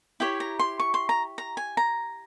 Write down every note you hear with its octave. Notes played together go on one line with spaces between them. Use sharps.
E4 G4 C#5 G5
A#5
C6
C#6
C6
A#5
A#5
G#5
A#5